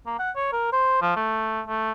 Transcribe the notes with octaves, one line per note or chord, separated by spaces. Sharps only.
A#3
F#5
C#5
A#4
C5
F3
A3
A3